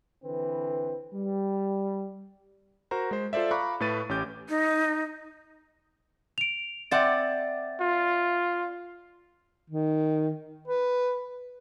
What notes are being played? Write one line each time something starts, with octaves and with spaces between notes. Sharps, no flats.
D3 E3 C4 B4
G3
F#4 A#4 C5 A#5
G#3 C5
F4 A4 C5 D5 E5
F5 A#5 B5 C#6 D6 F#6
A2 A3 B4 A6 D#7
A1 C#4 G4 D6 G6
D#4
D7 F7
C4 D5 E5 F#5 A6
F4
D#3
B4